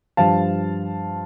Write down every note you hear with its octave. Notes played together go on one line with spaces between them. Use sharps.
G2 F3 F5 A5